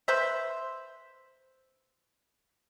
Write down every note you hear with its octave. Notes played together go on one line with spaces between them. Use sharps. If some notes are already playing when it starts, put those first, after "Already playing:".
B4 C5 E5